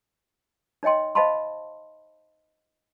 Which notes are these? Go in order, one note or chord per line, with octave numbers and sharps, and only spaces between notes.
D#4 C#5 D#5 G5 C6
C5 D#5 F5 A5 B5 C6